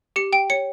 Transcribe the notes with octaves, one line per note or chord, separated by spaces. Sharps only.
G4 C#7
G5 D7
C#5 C#7